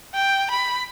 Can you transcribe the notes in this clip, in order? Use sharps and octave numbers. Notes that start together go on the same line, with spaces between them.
G5
B5